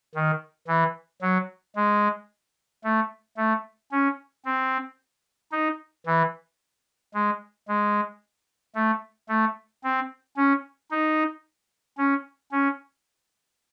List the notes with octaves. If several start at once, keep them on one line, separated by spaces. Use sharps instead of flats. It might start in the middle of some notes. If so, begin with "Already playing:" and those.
D#3
E3
F#3
G#3
A3
A3
C#4
C4
D#4
E3
G#3
G#3
A3
A3
C4
C#4
D#4
C#4
C#4